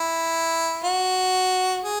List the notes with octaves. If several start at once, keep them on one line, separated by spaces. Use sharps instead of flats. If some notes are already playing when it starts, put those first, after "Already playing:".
Already playing: E4
F#4
G#4